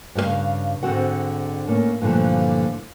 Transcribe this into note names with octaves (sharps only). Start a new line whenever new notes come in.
G2 C#3 G#4 F5
G#2 D3 C4 F#4 F#5
A2 A#3 C#4
G2 A#2 D3 E3 F3 A3